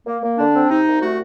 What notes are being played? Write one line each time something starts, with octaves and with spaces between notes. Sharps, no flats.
A#3
A#3
D3 D4
C4
C3 D#4
C2
A3 F#4